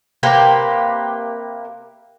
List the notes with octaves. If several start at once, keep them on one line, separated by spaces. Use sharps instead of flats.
C3 A#3 G4 B4